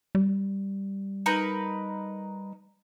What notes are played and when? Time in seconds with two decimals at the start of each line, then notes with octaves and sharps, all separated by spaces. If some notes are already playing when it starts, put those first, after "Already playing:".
0.15 G3
1.26 D#4 A#4 B4